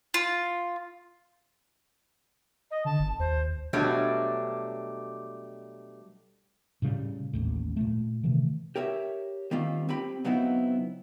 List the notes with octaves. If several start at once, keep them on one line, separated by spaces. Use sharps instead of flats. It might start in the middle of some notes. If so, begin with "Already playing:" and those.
F4
D#5
D3 A5
G1
D#2 C5
B2 F#3 G3 A3 D4 C#5
A2 C#3 F3 G3
A1 D#2 A2
A#2 A3
C3 D#3 E3 A3
G4 A#4 C#5 E5
D#3 G3 A#3 C4 F4
C4 G4 G5 B5
C#3 F#3 B3 C4 D#4 E4